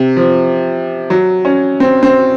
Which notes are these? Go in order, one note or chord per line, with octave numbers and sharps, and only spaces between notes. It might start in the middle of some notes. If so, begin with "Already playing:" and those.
Already playing: C3
F3
F#3
C#4
C4
C4